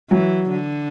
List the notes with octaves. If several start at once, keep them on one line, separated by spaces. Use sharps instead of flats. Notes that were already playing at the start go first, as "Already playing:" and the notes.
E3 F#3
D3